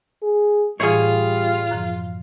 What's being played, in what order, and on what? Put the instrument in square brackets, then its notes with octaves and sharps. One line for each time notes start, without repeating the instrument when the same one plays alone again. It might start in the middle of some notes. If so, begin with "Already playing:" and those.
[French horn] G#4
[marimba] A2 E3 [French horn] G3 [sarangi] F4 [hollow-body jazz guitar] G#4 C#5
[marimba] F#2 D3 F3